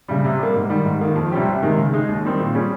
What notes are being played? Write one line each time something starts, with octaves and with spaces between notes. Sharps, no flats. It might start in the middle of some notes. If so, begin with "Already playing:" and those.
C#3 G3
C3
G3 A#3
G#2
D#3 G3
G#2
D#3 A#3
F2
C3 G3 C#4 G4
C2
C3 D#3 G#3
C#3
G#3 D#4 G#4
D#2
D#3 G3 C4 D#4
A#2
G3 C#4 G#4